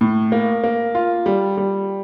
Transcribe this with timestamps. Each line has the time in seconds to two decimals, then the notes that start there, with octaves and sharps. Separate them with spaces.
0.01 A2
0.32 A#3
0.64 A#3
0.95 F4
1.26 G3
1.57 G3